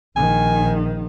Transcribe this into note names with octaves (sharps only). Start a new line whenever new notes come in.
A#1 D#3 G#5